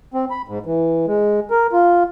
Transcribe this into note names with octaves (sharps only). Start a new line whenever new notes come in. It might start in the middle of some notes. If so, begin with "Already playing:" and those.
C4
B5
G#2
E3
G#3
A#4
F4